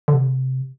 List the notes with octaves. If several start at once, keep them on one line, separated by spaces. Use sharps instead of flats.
D3
C3